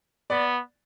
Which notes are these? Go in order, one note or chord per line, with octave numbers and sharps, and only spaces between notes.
B3 D5